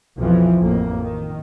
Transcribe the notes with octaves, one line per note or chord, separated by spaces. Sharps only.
B1 F2 E3 F3
A1 F2 A#3
D#3